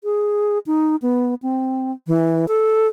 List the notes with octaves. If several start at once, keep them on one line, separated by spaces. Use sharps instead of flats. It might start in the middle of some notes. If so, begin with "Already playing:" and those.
G#4
D#4
B3
C4
E3
A4